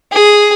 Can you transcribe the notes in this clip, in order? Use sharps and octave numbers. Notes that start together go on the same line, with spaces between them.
G#4